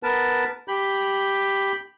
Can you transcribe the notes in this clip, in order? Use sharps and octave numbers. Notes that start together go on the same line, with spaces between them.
B3 A#4 B4 A5
G4 B5 G6